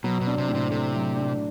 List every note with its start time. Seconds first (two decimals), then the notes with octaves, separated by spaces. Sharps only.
0.04 B2 F#3
0.21 B2
0.27 D4
0.38 C3
0.49 A2
0.55 C3
0.71 C3 A3
0.94 F#3
1.16 D4